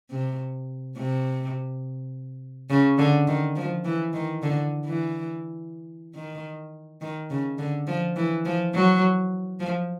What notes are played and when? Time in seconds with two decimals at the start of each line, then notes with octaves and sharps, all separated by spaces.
0.10 C3
0.96 C3
2.70 C#3
2.98 D3
3.27 D#3
3.56 F3
3.85 E3
4.13 D#3
4.42 D3
4.85 E3
6.15 D#3
7.01 D#3
7.30 C#3
7.59 D3
7.87 F3
8.16 E3
8.45 F3
8.74 F#3
9.60 F3